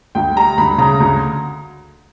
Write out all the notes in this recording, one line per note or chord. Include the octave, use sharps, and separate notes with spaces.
D2 G5
G3 A#5
D2 B5
C#3 A#5
D2